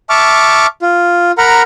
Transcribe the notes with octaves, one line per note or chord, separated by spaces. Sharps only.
E5 A5 C#6 D6 F6
F4
A#4 F#5 A#5 B5 F6